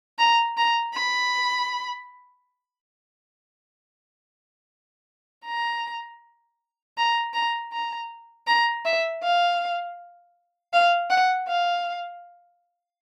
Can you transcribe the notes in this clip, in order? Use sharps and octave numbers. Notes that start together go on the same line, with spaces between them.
A#5
A#5
B5
A#5
A#5
A#5
A#5
A#5
E5
F5
F5
F#5
F5